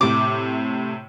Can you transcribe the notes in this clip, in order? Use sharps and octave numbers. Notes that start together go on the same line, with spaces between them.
A2 C3 D6